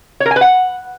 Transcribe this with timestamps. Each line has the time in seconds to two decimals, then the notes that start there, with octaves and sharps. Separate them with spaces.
0.20 C#5
0.26 A#4
0.31 G#5
0.36 B4
0.41 F#5